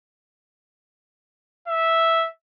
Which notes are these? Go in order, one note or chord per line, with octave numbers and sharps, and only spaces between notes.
E5